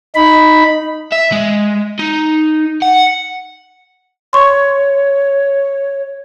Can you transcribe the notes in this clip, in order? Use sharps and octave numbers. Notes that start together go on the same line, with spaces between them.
D#4 B5
E5
G#3
D#4
F#5
C#5 C6 C#6